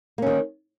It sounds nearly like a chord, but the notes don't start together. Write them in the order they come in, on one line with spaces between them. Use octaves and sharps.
A#3 C#4 D#3